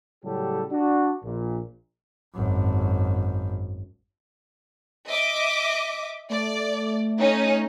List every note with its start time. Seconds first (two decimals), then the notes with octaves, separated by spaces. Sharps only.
0.24 A2 C#3 F#3 G3 G4 A4
0.72 D4 F#4
1.24 A#1 A#2
2.35 G#1 F#2
5.10 D#5 E5 D6
6.30 A3 D5
7.19 C#4 D#4